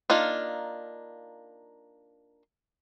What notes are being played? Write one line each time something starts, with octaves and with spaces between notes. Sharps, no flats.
A#3 D4 D#4 F4